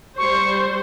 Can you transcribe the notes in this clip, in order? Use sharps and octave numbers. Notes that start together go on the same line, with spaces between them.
G3 C5 C#6